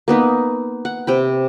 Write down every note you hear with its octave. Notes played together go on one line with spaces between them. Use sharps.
A#3 B3 D#4 B4
F#5
C3 G5 B5